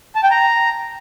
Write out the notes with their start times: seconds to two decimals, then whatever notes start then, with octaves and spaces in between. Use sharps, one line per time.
0.15 A5
0.23 G5
0.31 A#5